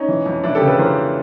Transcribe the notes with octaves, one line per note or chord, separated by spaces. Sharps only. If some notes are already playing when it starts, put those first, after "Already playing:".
Already playing: C#4 D#4
E3
F2
F2 D4 E4
G4 A4
C#3
A4 B4
E3 A#4 C5